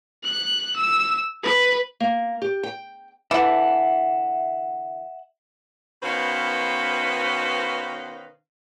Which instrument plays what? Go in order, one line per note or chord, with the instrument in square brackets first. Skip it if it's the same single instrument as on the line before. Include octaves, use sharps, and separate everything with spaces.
[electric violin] F#6
E6
B4
[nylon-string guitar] A#3
G4
G5
[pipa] D3 E3 [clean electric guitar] E5 F#5
[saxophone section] B2 D#3 C#4 B4 C5 F5